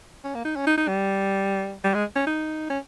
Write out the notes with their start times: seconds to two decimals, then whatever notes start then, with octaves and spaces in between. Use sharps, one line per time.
0.24 C#4
0.35 A#3
0.45 D#4
0.56 C#4
0.67 D#4
0.78 D#4
0.88 G3
1.84 G3
1.94 G#3
2.16 C#4
2.27 D#4
2.70 C#4